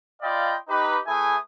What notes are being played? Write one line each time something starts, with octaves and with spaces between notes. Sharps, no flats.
F4 D5 D#5 F5 G5 B5
D#4 G4 B4
A3 E4 G#4 B4 G#5 D#6